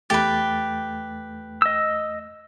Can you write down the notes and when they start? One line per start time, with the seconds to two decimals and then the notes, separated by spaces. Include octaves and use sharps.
0.10 E2 A3 G4 B4 A6
1.62 D#5 E6